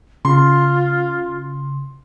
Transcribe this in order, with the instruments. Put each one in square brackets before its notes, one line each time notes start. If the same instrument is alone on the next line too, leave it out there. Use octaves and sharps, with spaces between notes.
[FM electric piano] C#3 [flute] F4 [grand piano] C6